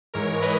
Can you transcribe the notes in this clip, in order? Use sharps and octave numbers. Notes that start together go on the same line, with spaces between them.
G#2 E3 G#3 A#4 C#5
B4 D#5